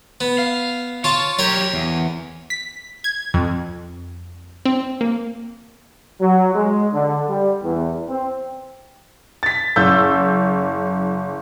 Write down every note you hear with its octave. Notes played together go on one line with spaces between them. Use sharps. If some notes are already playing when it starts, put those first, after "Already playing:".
B3
F5
F4 C#5 A5
F#3 G4 A#4 C#5 G5
E2
B6
G#6
F2
C4
A#3
F#3
G#3
D3
G3
E2
C4
A6 B6
F#1 E6 G6